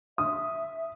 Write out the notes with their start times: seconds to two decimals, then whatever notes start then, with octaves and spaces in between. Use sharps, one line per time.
0.18 E5 D#6